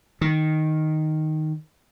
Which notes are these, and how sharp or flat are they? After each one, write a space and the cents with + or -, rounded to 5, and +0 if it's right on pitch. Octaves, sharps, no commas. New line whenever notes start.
D#3 +0